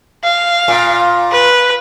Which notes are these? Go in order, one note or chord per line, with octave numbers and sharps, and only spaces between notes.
F5
A#2
B4